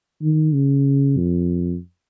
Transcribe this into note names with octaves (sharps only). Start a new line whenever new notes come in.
D#3
C#3
F2